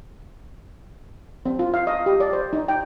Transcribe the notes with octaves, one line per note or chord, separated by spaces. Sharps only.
C4
F4
F5
D#5
G4
D5
C5
D#4
G5